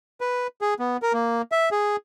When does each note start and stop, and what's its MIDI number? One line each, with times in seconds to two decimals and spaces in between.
0.21 0.47 71
0.61 0.74 68
0.80 0.97 59
1.02 1.13 70
1.13 1.42 58
1.52 1.69 76
1.72 1.96 68